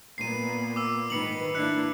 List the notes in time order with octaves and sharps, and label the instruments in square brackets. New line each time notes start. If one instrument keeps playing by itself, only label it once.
[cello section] A#2 A#3 B3 [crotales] C7 D#7
[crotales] D6 E6
[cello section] G#2 D#3 B4 [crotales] C#7 F#7
[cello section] A#3 D4 E4 [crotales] F#6 C#7